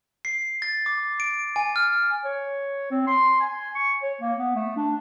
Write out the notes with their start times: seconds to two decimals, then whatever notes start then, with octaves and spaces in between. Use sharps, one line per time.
0.25 C7
0.62 A6
0.86 D6
1.20 D7
1.56 G#5
1.76 F6
2.25 C#5
2.91 C4
3.07 C6
3.40 G#5
3.75 C#6
4.03 C#5
4.21 A#3
4.39 B3
4.55 A3
4.76 D4